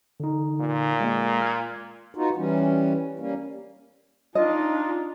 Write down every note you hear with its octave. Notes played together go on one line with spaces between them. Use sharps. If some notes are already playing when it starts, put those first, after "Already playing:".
D3 D#4
A#2
G#3 A#3
F6 G#6
B3 D#4 F4 F#4
E3 G3 C#4
G3 A#3 C#4
D4 D#4 F4 D#5